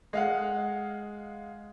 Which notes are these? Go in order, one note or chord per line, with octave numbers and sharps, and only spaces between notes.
G#3 F5 F#5